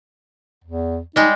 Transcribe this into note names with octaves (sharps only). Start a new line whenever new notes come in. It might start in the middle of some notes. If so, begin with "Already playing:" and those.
E2
G3 G#3 D#4